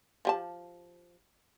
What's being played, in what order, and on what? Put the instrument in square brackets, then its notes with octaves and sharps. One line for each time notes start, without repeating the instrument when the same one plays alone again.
[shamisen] F3 G4 A5